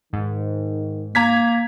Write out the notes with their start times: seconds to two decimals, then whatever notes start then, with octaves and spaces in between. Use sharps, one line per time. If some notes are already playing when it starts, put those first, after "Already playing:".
0.13 G#2 D#3
1.15 A#3 A#5 G#6 B6